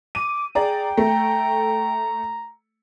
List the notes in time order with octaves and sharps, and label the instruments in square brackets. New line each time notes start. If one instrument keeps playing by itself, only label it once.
[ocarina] D6 [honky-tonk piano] D#7
[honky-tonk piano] G#4 D5 A#5 [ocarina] G5
[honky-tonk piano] A3 [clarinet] A#5